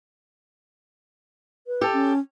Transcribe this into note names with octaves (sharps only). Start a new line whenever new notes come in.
B4
G4 A4
C#4